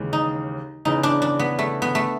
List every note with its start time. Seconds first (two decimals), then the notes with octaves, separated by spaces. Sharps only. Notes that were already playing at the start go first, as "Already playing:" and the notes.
Already playing: D#2 C#3 E3 G#3
0.13 D#4
0.85 E2 C#3 E3 D#4
1.03 D4
1.22 D4
1.39 B3
1.59 A3
1.82 B3
1.95 A3